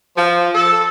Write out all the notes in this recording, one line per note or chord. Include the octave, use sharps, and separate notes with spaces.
F3
A4